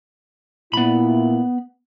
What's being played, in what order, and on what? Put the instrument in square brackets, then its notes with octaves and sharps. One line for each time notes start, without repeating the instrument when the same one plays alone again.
[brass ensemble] A#2 E4 [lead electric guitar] B3 B5